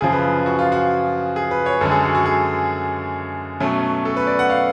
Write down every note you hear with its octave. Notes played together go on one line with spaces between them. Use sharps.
F#2 C#3 F3 G#4
B4
F#4
F4
F#4
G#4
B4
C#5
F#2 D3 G#3 A4
G#4
F#4
F#4
G#4
B2 F#3 A3 C#4
A4
B4
D5
F#5
F5